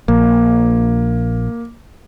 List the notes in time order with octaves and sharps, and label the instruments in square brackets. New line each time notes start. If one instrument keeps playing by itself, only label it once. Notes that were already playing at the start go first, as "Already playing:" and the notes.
[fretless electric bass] A#1 [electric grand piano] A#3